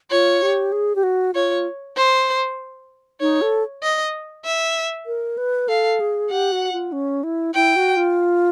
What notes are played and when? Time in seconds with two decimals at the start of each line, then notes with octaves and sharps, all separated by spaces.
0.11 F4 C#5
0.42 G4
0.72 G#4
0.96 G4
1.03 F#4
1.34 F4 C#5
1.97 C5
3.21 D#4 C#5
3.42 A4
3.83 D#5
4.45 E5
5.06 A#4
5.38 B4
5.68 A4 F5
6.00 G#4
6.31 G4 F#5
6.52 F#4
6.73 F4
6.92 C#4
7.24 E4
7.55 E4 G5
7.76 F#4
7.97 F4